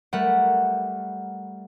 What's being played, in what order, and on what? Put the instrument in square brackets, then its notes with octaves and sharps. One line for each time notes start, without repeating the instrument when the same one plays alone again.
[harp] G3 A3 A#4 B4 F#5